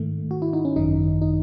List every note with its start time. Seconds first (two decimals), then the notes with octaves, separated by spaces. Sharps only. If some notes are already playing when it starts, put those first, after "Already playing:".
Already playing: G#2 D#3 A3
0.31 F#4
0.42 E4
0.53 D#4
0.65 C#4
0.76 G#1 F#2 D#3 D#4
1.22 D#4